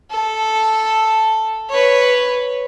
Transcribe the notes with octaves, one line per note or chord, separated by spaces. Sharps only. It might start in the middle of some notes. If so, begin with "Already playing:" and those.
A4
B4 C#5